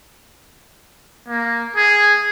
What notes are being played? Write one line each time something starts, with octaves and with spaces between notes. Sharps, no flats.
A#3
G#4